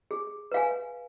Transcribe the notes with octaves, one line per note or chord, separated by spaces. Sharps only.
G#4
B4 F5 G#5